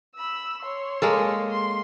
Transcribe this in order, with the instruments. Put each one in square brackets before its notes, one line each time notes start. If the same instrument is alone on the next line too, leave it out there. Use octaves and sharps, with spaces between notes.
[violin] B5 E6
C#5 C6
[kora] G#3 A#3 A4
[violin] C6